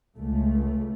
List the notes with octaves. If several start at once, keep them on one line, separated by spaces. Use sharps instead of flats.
C#2 A3